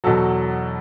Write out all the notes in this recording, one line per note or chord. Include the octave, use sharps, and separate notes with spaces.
E2 B2 F#3 A4